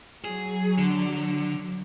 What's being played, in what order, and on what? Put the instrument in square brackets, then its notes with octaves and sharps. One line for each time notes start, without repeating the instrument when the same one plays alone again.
[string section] F#3 [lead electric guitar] G#4
[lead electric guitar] D3